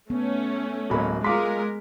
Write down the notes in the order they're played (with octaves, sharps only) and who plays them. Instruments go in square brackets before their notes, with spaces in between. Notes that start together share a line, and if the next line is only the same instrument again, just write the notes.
[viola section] A3 C#4 [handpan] B3
[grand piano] D1 B5 [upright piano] F#3 G#3 A#3
[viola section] G#3 A#4 [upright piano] F4 F5 C6 [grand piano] D6 B6